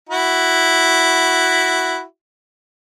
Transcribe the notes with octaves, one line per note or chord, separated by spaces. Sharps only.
E4 F#4